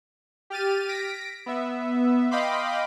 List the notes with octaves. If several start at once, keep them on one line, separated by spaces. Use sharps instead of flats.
G4 F6 A6 D#7
A#6 B6 D7
B3 E5
D#5 F5 G5 B5 C6 D6